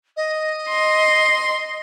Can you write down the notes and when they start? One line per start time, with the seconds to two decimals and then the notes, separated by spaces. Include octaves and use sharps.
0.16 D#5
0.69 C6